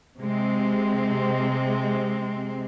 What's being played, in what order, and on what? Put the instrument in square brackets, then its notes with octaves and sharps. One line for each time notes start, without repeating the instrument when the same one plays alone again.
[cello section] C3 G#3 C4